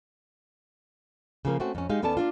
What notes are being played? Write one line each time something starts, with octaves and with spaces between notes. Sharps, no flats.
C#3 F3 A#3
A3 C4 C#4 F#4
F2 C#4
G#3 D#4 G4 F5
D#2 B3 C#4 A4 D5 A5
A#3 D4 F4